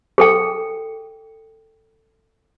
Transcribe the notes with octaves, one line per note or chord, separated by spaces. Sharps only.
G#4 A4 G5